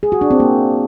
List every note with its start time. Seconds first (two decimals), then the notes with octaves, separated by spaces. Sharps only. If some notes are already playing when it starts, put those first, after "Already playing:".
0.03 G#4
0.12 F#4
0.21 D4
0.31 C4
0.40 A#3